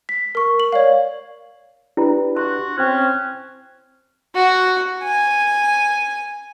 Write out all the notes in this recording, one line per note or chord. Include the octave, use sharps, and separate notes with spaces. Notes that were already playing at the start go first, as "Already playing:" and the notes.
B6
A#4 C#6
F#7
C#5 D5 F5
D4 E4 G4 B4
F#4 C6
C4 C#4 C5 G5 F#6
F#4
G#5